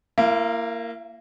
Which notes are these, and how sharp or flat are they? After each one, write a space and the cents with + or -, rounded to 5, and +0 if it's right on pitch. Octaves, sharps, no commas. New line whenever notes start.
A#3 -10 E4 +35